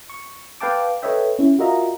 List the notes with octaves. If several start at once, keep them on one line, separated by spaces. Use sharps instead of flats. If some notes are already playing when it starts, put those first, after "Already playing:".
C#6
B4 F5 G5 A5 D6
A4 B4 C#5 D#5 E5 G5
C#4 E4
F4 F#4 A#4 D#5 E5 A#5